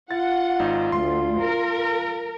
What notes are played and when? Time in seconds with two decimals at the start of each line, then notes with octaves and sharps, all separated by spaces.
0.11 F4 F#5 A6
0.59 G#1 D#4
0.92 D2 C6
1.41 A#4